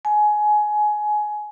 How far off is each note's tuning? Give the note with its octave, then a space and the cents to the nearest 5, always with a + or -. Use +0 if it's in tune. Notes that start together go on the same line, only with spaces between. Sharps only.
G#5 +20